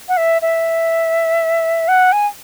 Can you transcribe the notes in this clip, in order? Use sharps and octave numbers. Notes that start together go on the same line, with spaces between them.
F#5
E5
E5
F#5
G#5